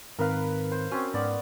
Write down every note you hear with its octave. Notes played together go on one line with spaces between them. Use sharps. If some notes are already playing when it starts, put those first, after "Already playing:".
G#2 D#3 C4 A#4 B4 F5
C5
C4 C#4 F#4
G#2 B3 D5